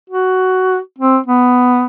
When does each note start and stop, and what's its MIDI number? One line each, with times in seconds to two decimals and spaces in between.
0.10 0.78 66
0.99 1.18 60
1.27 1.86 59